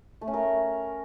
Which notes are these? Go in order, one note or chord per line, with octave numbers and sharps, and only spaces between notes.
A3
C#4
A#4